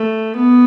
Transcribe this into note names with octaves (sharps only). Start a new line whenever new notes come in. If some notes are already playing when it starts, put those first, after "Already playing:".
Already playing: A3
B3